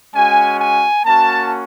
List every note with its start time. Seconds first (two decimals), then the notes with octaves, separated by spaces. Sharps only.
0.15 G#3 C#4 F#4 G#5
0.59 G#5
1.05 A#3 C#4 F#4 A5